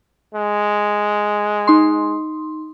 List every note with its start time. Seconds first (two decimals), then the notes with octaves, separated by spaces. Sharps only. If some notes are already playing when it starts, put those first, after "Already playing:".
0.35 G#3
1.67 D#4 C6